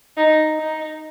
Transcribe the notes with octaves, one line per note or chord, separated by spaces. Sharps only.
D#4
D#4